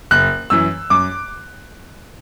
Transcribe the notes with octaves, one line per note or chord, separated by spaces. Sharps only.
F#1 F#6
F#2 E3 E6
F#2 D6